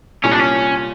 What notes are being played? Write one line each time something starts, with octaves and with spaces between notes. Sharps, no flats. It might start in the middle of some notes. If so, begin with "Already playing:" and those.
C2 A#2 G3 C#4
D4
C#4